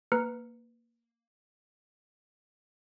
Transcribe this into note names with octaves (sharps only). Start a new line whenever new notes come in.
A#3 B4 A#5 F6 F#6 C#7